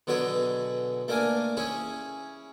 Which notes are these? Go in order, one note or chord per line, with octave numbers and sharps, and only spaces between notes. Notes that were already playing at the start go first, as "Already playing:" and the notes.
B2 D3 F#3 G#4 B4
A3 A#3 D4 A#4 G#5
C#4 E4 G#4